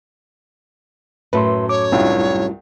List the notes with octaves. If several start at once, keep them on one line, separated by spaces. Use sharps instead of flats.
F#2 A2 A4 B4 E5 C6
C#5 D6
C2 G2 G3 E4 F4